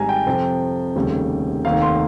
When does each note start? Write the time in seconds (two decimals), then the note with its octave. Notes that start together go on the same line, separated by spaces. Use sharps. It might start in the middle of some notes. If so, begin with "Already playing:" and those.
Already playing: G#1 G#2 G3 G#5 A#5
0.09 G5
0.26 F2 C3 F3
0.96 F1 D#2 C#3 G3
1.65 F1 D#2 D#3 F5
1.82 C6